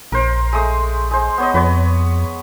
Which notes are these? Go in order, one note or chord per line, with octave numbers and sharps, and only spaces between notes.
A#1 A#4 C5
G#3 A3 D#6
G#3 C5
B3 C#5 D#5
F2 B4 C#5